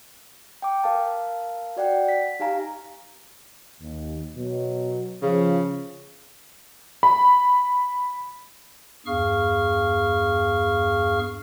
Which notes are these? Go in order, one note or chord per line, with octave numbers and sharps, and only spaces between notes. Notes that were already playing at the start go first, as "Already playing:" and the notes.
G5 D6
A#4 F5 A5
F#4 D5 F#5 G5
B6
D#4 G4 F5 G#5 A#5
D#2
B2 F#3
C#3 F3
B5
E2 G2 G#4 F5 C#6 F6